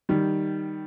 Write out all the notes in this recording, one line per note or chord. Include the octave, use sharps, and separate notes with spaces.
D#3 G3